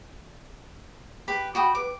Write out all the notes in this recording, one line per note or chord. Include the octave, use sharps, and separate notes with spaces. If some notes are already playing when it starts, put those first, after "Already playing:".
G4 B4 B5
F#4 G5 B5 D#6
B4 D6